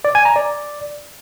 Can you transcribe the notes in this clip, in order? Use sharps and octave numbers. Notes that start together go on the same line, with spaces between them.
D5
G#5
A#5
D5